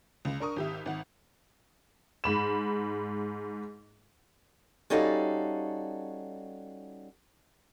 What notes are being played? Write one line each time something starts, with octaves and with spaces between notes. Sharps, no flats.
C#2
D4 A#4 C#6 D#6
G#1 G4 E5
G#1 F#5
G#2 B5 E7
G3 C#4 D#4 F#4 A4 F5